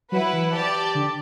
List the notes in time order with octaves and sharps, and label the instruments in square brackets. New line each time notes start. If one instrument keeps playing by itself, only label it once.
[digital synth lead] F#3 [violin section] E4 B4 F#5
[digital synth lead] E3
[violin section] G4 D5 A5
[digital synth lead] D3